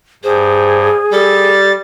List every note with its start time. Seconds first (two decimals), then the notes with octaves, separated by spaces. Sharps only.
0.24 G2 G#4 C5
1.12 G3 A4 A6